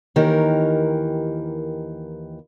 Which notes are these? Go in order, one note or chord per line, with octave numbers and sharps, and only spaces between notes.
D#2 D#3 E3 G4 A#4